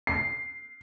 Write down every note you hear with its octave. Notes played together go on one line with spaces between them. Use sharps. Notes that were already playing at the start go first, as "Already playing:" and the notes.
C7